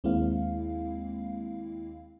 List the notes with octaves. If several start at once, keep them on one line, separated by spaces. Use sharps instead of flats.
D#2 G#3 A#3 C4 E4 F5